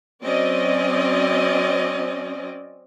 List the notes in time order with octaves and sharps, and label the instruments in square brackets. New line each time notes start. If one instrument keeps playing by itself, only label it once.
[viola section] F#3 C4 C#4 D5 D#5